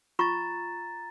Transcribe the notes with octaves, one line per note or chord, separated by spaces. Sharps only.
F4 A#5 C#6 A6